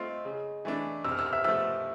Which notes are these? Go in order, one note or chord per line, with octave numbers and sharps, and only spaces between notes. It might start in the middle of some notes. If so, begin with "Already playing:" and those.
Already playing: A3 C4 F4 D#5
C#3
E3 A3 D4
C3 E6
F6
E6
F6
E5 E6
F3 A3 E5 E6